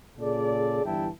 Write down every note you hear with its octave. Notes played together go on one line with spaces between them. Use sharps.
A#2 C#3 G#4 A4 D5
G1 G2 E3 E4 G5 A5